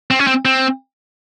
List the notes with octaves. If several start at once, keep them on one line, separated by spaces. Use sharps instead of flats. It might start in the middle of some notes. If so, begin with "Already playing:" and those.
C4
C#4
C4
C4